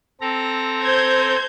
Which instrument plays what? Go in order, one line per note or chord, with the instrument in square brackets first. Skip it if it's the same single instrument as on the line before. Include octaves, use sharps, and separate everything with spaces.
[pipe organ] C4 A4 A#5
[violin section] C5 G6 G#6